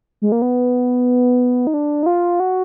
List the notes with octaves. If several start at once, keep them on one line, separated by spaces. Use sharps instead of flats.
G#3
A#3
B3
D#4
D4
D#4
F4
F#4